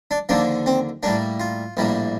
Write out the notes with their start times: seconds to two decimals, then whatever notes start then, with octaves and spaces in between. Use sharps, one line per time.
0.11 D4
0.29 D#2 D3 F3 A#3 D4
0.66 C4
1.03 A2 G3 A#3 D4
1.40 F4
1.77 A#1 A2 G3 A#3